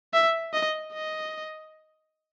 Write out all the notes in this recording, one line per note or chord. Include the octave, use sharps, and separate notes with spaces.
E5
D#5
D#5